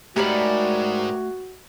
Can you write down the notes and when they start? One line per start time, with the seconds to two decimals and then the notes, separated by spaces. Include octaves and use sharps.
0.16 G#2 A3 F#4 G4 A#4 C#5 D5 B5